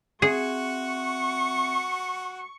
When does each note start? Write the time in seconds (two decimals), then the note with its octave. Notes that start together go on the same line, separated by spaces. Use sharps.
0.22 C4 F#4 G#4 E5 C#6